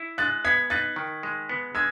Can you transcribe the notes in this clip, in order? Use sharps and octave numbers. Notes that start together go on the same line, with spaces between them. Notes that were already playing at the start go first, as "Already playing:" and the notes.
Already playing: E4
G#3 F#6 A6
B3 G#6 B6
D#4 F#6 A6
D#3
G#3
B3
G#3 E6 G#6